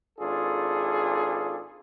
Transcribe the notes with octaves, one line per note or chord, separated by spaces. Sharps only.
G#1 D4 F4 G#4 A4